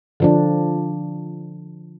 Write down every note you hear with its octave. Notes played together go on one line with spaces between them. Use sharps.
D3 F3 D4